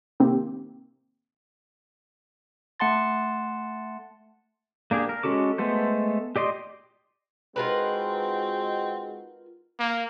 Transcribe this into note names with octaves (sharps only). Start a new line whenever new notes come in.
A2 C3 D#3 A#3 C4 G4
A3 F#5 A5 C6 A6
A#3 D4 G4 G#4
A#4
G#3 C#4 F#4 A4 D6
G#3 A3 B3 A4 C5
G4 D5 D#5 C6
G#3 C4 D#4 F4 F#4 A#4 B4
A#3